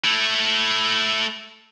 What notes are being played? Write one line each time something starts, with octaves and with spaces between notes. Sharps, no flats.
A3 E4